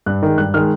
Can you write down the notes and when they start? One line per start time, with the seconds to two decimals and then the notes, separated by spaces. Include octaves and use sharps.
0.06 G2 F#6
0.23 D#3 G#3
0.38 G2 F#6
0.54 D#3 G#3 F6